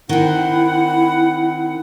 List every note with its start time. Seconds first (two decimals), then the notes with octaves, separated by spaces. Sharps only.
0.09 D#3 C4 E4 F#5